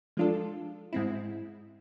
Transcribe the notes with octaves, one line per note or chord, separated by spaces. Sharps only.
F3 G#3 D4 F4 A4
G#2 G#3 C4 E4